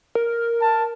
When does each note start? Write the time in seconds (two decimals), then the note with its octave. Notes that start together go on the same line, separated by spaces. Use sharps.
0.15 A#4
0.61 A5